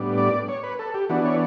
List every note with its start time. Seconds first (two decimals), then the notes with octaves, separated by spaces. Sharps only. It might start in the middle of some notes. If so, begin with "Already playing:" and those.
Already playing: A2 G3 B3 D4
0.18 D5
0.48 C#5
0.63 B4
0.79 A4
0.94 G4
1.09 E3 B3 D4 F#4
1.25 C#5